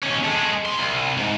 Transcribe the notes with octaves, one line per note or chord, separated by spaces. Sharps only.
D#2 C#4
G#3 A3
C3 C6
C2
G#2